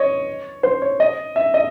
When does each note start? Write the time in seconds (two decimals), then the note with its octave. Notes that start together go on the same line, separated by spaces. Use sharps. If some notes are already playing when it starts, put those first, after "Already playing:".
Already playing: C#5 D#5
0.63 C5
0.82 C#5
1.00 D#5
1.36 E5
1.54 D#5